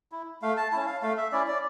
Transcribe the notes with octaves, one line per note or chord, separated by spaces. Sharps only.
E4
A3 F5
A5
C#4 E4 A5
F5
A3 F5
E5
C#4 E4 D5
D5